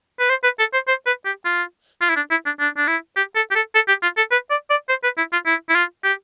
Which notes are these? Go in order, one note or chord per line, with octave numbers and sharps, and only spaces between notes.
B4
C5
B4
A4
C5
C5
B4
G4
F4
F4
E4
D4
E4
D4
D4
D4
E4
G4
A4
G4
A4
A4
G4
F4
A4
B4
D5
D5
C5
B4
E4
F4
E4
E4
F4
G4